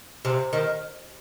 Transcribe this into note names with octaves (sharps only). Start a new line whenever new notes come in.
C3
D#3